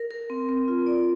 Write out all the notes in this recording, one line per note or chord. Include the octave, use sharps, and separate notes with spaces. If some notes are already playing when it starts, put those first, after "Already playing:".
Already playing: A#4
A#4
C4
C4
F4
D5